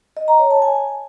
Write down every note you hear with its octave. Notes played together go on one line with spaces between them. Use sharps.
D#5
A#5
C#5
A5
G#5